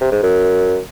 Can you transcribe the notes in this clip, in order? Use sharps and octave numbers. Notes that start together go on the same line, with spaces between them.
C3
G#2
F#2